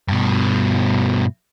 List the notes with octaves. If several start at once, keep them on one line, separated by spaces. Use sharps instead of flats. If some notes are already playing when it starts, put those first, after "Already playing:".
G2 B2